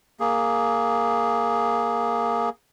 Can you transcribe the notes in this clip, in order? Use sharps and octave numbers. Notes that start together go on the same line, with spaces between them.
A#3 G#4